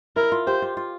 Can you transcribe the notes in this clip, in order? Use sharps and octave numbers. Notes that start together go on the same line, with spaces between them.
E4 A#4
F4
G4 C5
F4
F4